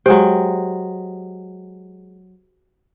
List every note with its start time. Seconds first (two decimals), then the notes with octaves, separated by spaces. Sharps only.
0.06 F#3 G#3 G4 C5 G5